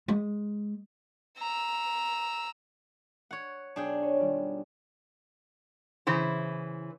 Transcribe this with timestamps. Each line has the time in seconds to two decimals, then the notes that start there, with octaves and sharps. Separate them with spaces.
0.08 G#3
1.39 A#5 E6
3.31 C#5 F#5
3.76 B1 D4 G#4 G5
4.02 C#5 D#7
4.20 D#3 G3 F4
6.07 C#3 E3 C5